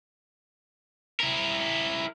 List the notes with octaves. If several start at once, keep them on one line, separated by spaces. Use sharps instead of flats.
E4 A#4